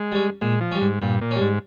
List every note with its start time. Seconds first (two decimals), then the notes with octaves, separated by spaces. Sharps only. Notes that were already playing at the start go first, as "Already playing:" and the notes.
Already playing: G#3
0.12 G3 C#4
0.42 A#2 G#3
0.61 F3
0.71 G3 C#4
0.81 G#2
1.02 G2 A#2
1.21 A#2
1.31 G3 C#4
1.41 G#2